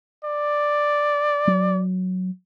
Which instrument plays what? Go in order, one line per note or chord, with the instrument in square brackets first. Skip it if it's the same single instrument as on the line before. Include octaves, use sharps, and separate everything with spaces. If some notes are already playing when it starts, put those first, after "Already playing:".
[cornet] D5
[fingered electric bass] F#3